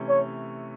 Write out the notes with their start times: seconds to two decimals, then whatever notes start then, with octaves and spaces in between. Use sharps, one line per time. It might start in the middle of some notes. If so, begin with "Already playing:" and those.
Already playing: C3 E3 A3 C#4
0.09 C#5